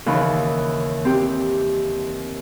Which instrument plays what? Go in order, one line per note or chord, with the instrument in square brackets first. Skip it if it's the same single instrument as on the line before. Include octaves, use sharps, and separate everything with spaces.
[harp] D#2 C#3 E3
C4 G4